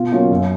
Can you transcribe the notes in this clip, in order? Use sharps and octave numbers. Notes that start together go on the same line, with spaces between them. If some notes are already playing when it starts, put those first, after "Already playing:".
Already playing: B2 F4
F#3 A#3 C#4 F4
F#2